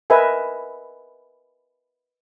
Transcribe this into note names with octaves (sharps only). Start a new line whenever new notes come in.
A#4 B4 D#5 E5 G#5